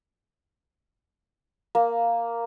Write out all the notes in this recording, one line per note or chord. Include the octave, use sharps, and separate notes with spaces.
A#3